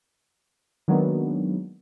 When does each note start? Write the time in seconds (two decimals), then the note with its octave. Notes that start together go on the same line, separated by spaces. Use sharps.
0.88 D#3 F#3 G#3 A#3 B3 D4